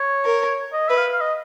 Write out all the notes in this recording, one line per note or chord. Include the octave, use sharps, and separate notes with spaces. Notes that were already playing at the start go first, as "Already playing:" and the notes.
Already playing: C#5
A#4
D#5
B4 E5
F5
F5
D#5